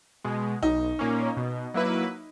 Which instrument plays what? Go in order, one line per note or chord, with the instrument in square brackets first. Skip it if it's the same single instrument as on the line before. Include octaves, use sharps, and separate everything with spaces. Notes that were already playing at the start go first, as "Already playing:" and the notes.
[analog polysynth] B2 G#3
[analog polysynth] B1 [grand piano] D#4
[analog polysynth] A#2 A#3 C#4
B2
F#3 A#3 E4 B4